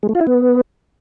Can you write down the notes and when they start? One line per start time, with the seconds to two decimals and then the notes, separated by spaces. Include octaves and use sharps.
0.03 G#3
0.09 A3
0.15 F4
0.21 E4
0.27 B3